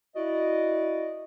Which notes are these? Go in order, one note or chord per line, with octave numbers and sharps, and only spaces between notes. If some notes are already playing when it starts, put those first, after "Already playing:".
E4 F#4 D5 D#5